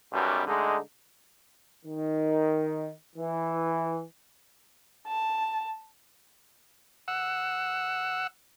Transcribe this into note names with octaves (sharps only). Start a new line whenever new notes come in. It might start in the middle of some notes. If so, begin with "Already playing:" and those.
B1 F#2 B2 G3
D3 G#3 A3 D#4
D#3
E3
A5
F#5 E6